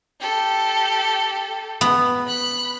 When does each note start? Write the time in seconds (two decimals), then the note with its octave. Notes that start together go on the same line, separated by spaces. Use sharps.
0.21 G4 A4
1.81 B3
2.27 B5 F#6